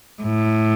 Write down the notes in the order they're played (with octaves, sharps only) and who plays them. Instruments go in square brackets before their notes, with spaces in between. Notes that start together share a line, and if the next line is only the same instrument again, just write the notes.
[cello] A2